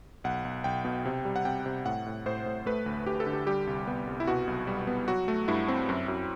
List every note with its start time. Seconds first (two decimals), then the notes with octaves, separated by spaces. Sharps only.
0.24 B1 F#5
0.45 B1
0.64 B1 G5
0.85 B2
1.05 C3
1.25 G3
1.36 F#5
1.45 C3 G5
1.66 C3
1.86 A2 F#5
2.06 A2
2.26 A2 C5
2.46 A2
2.66 A3 B4
2.86 D2
3.06 D2 G4
3.20 A4
3.26 D3
3.33 G4
3.46 G3 G4
3.67 C2
3.87 B3
4.07 C2
4.20 E4
4.27 B2 F#4
4.47 B1
4.67 G3
4.87 B3
5.08 F#3 F#4
5.28 A3
5.48 G2 E4
5.68 C4
5.89 F#2
6.08 F#2